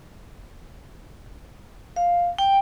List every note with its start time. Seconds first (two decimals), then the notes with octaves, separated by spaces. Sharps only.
1.96 F5
2.39 G5